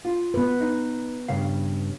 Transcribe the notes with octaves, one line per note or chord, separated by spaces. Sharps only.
F4
B3 B4
D#4
G2 C#3 F5